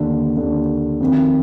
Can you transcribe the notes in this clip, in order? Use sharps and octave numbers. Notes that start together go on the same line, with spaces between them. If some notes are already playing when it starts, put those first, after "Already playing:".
Already playing: D#2 D3
D#2 D3
F2 D#3